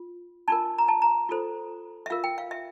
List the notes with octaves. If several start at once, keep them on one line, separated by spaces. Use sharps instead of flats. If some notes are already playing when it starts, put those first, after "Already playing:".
Already playing: F4
D4 F4 A#4 A5
A#5
A5
A#5
F4 A4 C5
E5
F4 A#4 F5
G5
F5
E5